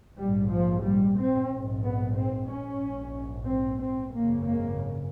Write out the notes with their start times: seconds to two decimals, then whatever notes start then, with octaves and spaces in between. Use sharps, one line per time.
0.18 A#1 G#2 G3
0.51 F3
0.84 G3
1.17 C4
1.50 A#1 G#2
1.83 B3
2.17 C4
2.50 C#4
2.82 A#1 G#2
3.48 C4
3.81 C4
4.14 G#1 F#2 C#3 A#3
4.47 A#3